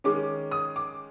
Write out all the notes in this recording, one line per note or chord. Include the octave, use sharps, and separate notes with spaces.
D#3 G#3 C#4 D6
D#6
D6